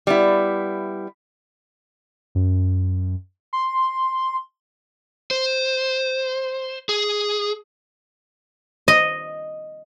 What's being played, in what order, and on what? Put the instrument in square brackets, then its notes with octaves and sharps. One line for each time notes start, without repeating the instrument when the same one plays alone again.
[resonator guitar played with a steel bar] G3 B3 E4
[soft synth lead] F#2
C6
[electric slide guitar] C5
G#4
[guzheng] D#5